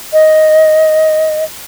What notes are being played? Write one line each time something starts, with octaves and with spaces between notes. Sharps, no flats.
D#5